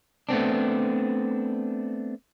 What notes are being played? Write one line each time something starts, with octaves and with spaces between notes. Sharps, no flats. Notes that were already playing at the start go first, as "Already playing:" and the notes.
A3 B3 C4 D4